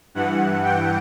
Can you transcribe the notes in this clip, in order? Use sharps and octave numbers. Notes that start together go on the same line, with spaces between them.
G2 E3 F#5
G5